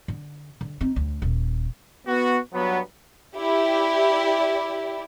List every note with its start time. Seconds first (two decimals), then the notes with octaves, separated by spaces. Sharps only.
0.08 D3
0.61 D3
0.81 C4 D#4
0.96 D2
1.22 D#1
2.07 B3 F#4
2.54 G2 F#3 B3
3.35 E4 G4 D5